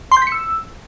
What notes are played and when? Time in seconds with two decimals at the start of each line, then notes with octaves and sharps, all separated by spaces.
0.12 C6
0.17 G6
0.22 B6
0.27 C#7
0.32 E6